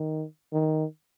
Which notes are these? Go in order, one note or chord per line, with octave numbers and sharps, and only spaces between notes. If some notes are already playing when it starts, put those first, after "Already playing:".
Already playing: D#3
D#3